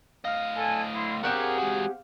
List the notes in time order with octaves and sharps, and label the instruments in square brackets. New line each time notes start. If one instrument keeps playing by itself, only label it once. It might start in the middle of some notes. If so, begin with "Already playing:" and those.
[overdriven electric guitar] A2 D#5 [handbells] F5 F6
[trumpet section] A4 G#5
E4 C6
[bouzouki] C4 G4 F#5 [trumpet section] G#4 [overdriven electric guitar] A#4 C#5
[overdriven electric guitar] G#3 F#4